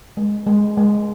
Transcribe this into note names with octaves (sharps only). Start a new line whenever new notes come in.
G#3
G#3
G#3